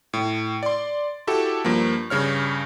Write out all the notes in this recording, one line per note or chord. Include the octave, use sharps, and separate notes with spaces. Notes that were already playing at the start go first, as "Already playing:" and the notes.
A2
D5 C6
E4 F#4 G4 A4
G2 F3 A#3
G2 C#3 C#5 F6